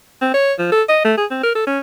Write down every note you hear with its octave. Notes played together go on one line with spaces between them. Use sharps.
C4
C#5
F3
A4
D#5
A3
G#4
C4
A#4
A4
C#4